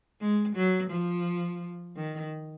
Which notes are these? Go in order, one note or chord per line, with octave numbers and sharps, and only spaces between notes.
G#3
F#3
F3
D#3